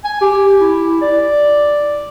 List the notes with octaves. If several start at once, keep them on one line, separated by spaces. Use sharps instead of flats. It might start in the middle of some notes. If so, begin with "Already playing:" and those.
G#5
G4
E4
D5